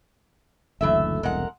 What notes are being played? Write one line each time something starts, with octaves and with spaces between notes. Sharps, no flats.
F#1 D2 E3 A4 E5
E1 C2 G#3 A#4 F#5